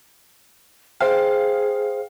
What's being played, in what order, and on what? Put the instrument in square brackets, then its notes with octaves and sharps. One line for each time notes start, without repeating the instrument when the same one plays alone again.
[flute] G#4 [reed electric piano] C5 G5 [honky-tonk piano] F5